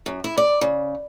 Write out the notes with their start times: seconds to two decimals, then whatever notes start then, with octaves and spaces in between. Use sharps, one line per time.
0.06 F#2
0.24 E4
0.38 D5
0.61 C#3